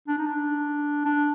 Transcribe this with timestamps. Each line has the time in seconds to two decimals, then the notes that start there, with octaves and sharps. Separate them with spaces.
0.08 D4
0.19 D#4
0.27 D4
1.05 D4